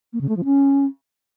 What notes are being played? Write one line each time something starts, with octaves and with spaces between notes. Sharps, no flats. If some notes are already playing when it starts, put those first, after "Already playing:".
A#3
C#3
A3
F3
C#4